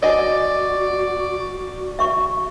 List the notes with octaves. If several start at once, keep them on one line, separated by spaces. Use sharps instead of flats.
F#4 D5 D#5 G#5
E5 C#6